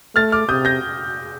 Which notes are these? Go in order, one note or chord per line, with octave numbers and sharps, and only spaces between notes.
A3 F6 A6
D6 F6
C3 D#6 G6
G6 A#6